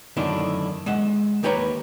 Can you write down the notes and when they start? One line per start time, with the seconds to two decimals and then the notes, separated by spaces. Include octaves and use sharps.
0.17 F#2 D3 D#3 A3 D4 E4
0.86 G#3 E5 F#5
1.43 D#2 A#3 G4 B4 C#5 A#5